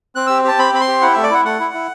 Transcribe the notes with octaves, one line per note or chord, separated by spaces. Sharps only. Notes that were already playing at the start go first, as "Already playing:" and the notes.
C4 F#6
G4 E6
G4 A5
C4 B5
C4 B5
C6
G4
E4 F#5
A3 E5
D5
E4 F#5
A3 F#5
E4
E4